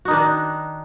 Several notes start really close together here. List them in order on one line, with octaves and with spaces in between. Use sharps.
F#4 D#4 D#3 D4